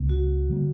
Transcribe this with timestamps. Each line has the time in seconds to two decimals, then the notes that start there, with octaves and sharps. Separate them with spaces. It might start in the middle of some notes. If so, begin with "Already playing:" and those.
Already playing: C#2 C#3 A#3
0.09 F#4
0.50 D3 G3 A#3